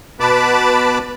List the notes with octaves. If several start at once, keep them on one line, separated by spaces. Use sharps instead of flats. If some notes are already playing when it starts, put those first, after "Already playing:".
B2 B4 A5 B5 D6